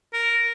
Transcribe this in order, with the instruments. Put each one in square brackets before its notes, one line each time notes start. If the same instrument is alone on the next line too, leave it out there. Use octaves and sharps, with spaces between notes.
[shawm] A#4